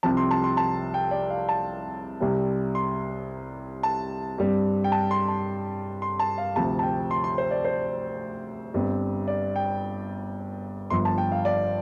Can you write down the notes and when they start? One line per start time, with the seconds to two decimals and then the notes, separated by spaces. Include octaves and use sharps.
0.03 C2 C3 F3 C4 A5
0.17 C6
0.31 A5
0.44 C6
0.57 A5
0.94 G5
1.11 D5
1.30 F5
1.49 A5
2.20 C2 C3 G3 C4
2.75 C6
3.83 A5
4.38 G2 G3 C4
4.84 G5
4.92 A5
5.11 C6
5.28 A5
6.02 C6
6.20 A5
6.38 F5
6.56 D2 C3 F3 A5
6.79 A5
6.83 G5
7.11 C6
7.24 C6
7.38 C5
7.51 D5
7.65 C5
8.74 G1 G2 G3 C4
9.28 D5
9.56 G5
10.90 G1 G2 F3 C6
11.05 A5
11.18 G5
11.32 F5
11.45 D5